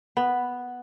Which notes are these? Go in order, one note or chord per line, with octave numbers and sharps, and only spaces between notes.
B3